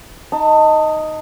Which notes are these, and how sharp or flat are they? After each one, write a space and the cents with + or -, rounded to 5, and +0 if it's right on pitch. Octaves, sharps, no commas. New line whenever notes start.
D#4 +0 A5 +30